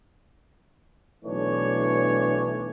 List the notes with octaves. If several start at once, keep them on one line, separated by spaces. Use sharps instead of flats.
B1 E3 A3 D4 C#5